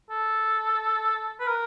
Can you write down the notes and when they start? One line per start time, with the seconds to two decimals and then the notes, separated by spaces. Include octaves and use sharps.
0.10 A4
1.40 B4
1.48 A#4